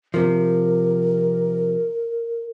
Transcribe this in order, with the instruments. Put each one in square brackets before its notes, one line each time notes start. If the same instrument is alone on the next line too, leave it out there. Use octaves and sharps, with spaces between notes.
[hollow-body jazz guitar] C3 F3 [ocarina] A#4